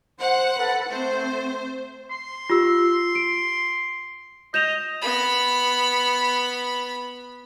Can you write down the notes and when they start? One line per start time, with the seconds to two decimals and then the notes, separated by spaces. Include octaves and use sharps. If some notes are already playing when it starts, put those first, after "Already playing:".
0.20 C5 F#5
0.59 A4 B4
0.90 A3 C4 C5
2.11 C6
2.50 F4 G4 E6
3.15 D7
4.54 D#5 G6 E7 F7
5.02 B3 B5